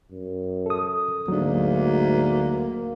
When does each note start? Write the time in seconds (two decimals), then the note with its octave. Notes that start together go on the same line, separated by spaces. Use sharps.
0.11 F#2
0.66 A4 D#6
1.28 D2 G#2 F#3 A#3 D4